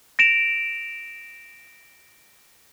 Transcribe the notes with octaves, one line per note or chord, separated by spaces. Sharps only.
A#6 D7 E7 F7